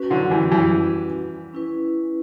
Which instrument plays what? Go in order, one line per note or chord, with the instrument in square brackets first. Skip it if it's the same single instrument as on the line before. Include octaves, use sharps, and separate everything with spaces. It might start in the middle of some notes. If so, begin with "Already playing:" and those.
Already playing: [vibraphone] C#4 F#4 B4
[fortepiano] D3 F#3
E3 G3
E3 G3
[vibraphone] C#4 E4 B4